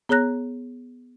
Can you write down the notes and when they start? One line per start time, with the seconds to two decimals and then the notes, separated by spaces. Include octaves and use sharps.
0.09 B3 G#4 C#5 A#5 F#6 A#6